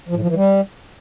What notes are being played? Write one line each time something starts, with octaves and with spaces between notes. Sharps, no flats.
F3
A2
F3
E3
G3